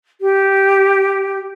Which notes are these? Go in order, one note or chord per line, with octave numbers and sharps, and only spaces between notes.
G4